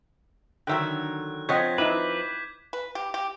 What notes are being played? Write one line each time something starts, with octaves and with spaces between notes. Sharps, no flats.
D3 D#3 F#3 E5 G5 F#6
F3 C4 C#5 D#5 F#5 G6 G#6 B6
D#4 E4 B4 B5 D6
B4
G4
G4